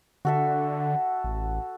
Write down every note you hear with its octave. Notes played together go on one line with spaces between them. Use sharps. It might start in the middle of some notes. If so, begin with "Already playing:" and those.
D3 F#4 A4 E5
A1